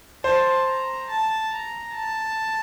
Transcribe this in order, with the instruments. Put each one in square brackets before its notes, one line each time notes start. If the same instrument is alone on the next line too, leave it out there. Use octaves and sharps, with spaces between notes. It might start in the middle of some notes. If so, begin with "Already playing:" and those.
[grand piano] C5 [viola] A5
[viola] A#5
A5
A#5
A5